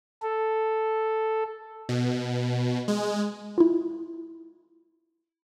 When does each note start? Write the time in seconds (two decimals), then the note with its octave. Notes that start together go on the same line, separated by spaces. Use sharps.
0.22 A4
1.89 B2
2.88 G#3
3.58 E4 F4